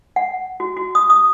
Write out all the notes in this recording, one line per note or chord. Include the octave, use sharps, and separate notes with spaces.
F#5
F#4
F#4
D#6
D#6